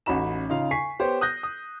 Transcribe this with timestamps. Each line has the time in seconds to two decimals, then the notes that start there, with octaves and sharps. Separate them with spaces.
0.06 A1 C#4 D#4 F#4 B5 E7
0.49 C#3 D#4 F4 F5
0.71 G#5 C#6 B6 C7
0.99 B3 G4 C5 C#5
1.21 D#6 F#6 G6 A#6
1.43 D#6